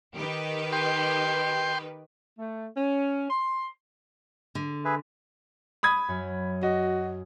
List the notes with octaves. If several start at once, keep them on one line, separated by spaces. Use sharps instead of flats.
D#3 G4 B4
G5 C6
A3
C#4
C6
D3
G#4 B4 E5
B5 D#6 G#6
F#2
F#4 D#5